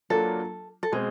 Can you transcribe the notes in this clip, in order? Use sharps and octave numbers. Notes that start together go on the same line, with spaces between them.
F#3 A#3 D4 F4 A4
A4
B2 G#3 C4 G#4